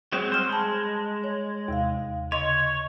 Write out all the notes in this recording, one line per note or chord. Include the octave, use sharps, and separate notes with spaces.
F#3 G#3 C4
G3 C5 F6
G#3 A5 B5
C#5
D#2 C3 F5
C#3 C#5 D#5 C6